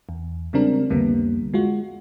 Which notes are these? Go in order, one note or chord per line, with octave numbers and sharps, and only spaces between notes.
E2
C#3 G3 G#3 C4 D4 A#4
C2 F2 D3 G3 A#3 B3
G#3 F4 F#4